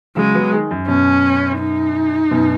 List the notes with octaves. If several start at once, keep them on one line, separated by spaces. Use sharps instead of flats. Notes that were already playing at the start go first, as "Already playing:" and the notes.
C#3 F#3 G#3
F#3 B3
D#3 G#3
F#2
F#2 B2 C#4
D#4
F#2 B2